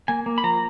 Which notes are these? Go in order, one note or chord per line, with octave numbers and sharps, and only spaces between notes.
A#3 G#5
A#3
B5
F3 A#5